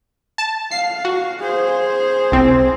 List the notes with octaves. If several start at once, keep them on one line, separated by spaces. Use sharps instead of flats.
A5
F5 C7
F#4
G#4 C5
C2 C4